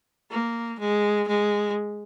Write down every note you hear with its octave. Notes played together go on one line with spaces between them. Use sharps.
A#3
G#3
G#3